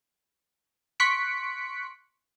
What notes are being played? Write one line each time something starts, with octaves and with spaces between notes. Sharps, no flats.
C6 C#6 F#6 B6 C#7 D7